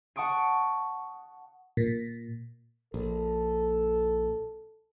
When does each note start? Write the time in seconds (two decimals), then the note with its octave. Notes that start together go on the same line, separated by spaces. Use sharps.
0.16 F#5 A5 C#6 D#6 D7
1.77 A#2
2.94 A#1 A4